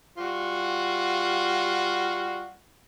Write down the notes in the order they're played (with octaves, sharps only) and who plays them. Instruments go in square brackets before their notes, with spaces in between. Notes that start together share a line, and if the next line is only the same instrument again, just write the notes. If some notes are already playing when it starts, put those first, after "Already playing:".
[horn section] G3 F4 F#4